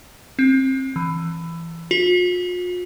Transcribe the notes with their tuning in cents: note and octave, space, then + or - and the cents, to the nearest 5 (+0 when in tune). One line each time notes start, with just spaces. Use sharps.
C4 +25
E3 +15
F4 +45